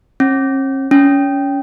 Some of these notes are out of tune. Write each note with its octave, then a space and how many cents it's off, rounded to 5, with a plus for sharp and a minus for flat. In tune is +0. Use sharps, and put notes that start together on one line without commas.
C#4 -45
C#4 +25